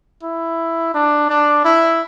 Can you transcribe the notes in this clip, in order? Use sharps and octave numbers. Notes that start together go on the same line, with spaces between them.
E4
D4
D4
E4